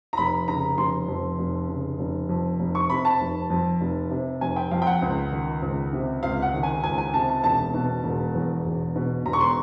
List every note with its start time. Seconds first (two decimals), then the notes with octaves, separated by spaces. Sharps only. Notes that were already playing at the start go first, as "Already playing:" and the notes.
0.13 A#5
0.17 F1 B5
0.48 C#3 A#5
0.77 F1 C6
1.08 F2
1.39 F1
1.68 C#3
1.99 F1
2.29 F2
2.60 F1
2.75 C#6
2.90 C3 B5
3.05 A5
3.21 F1
3.50 F2
3.81 F1
4.11 C3
4.41 F1 G#5
4.56 G5
4.71 F2 F5
4.82 G5
4.87 F#5
5.02 C#2
5.32 D#3
5.62 C#2
5.93 C3
6.23 C#2 F5
6.42 F#5
6.53 D#3
6.63 G#5
6.83 C#2 G#5
6.98 G#5
7.14 C3 A5
7.29 A5
7.44 E1 A5
7.74 B2
8.04 E1
8.34 E2
8.65 E1
8.96 B2
9.25 E1 A#5
9.33 C#6
9.40 C6